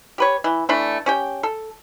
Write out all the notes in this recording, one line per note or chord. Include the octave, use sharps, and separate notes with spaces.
G4 B4 C#5
E3
E3 A3 D4
C#4 G4 G5
A4